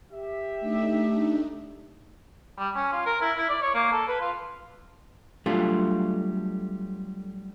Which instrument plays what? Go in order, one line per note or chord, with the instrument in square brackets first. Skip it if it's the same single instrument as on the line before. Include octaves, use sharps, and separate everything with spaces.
[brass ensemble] G4 E5
[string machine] A3 D4 D#4
[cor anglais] G3
C#4
F4
A#4
E4
E4
D5
C#5
A#3
A4
B4
F4
[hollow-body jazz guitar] F#3 G3 A3 D4 F4